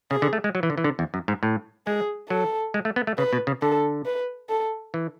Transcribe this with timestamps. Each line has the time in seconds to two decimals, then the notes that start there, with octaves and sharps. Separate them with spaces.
0.11 C#3 G#4
0.22 D3
0.33 A3
0.44 G#3
0.55 F#3
0.63 E3
0.70 D3
0.78 E3
0.84 D3
0.99 E2
1.14 F#2
1.28 G#2
1.43 A2
1.87 G#3 G#4
2.30 F#3 A4
2.74 G#3
2.85 A3
2.96 B3
3.07 A3
3.18 C#3 B4
3.33 B2
3.47 C#3
3.62 D3 A4
4.06 B4
4.49 A4
4.94 E3